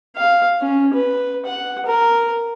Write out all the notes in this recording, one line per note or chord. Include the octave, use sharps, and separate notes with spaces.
F5
C#4
B4
F#5
A#4